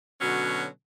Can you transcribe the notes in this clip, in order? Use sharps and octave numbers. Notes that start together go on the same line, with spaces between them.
B2 D3 F#3 C#4